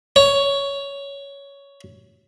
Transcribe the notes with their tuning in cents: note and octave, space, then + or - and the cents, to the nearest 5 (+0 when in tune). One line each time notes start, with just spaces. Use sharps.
C#5 +10